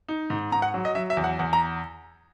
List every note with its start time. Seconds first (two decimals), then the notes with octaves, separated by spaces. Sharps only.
0.09 D#4
0.30 G#2
0.52 G#2 A#5
0.62 F#5
0.74 F#3
0.85 D#5
0.95 F#3 E5
1.10 E5
1.17 E2
1.24 F#5
1.39 E2 F#5
1.53 A#5